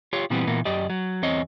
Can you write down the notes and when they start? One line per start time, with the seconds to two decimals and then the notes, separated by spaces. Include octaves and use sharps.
0.13 F4 G4 C#5
0.30 A#2 E3 G3 B3 C4
0.47 A#2 E3 A#3 B3
0.65 F#2 G4 D5 D#5
0.90 F#3
1.22 E2 C4 C#5 D#5